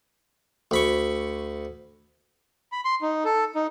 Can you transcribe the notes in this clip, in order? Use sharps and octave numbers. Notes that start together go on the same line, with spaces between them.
D2 B5 C#6
B5
C6
D#4
A4
D#4